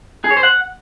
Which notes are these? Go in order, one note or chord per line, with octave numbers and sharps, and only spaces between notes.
G#4
C#5
C5
F#5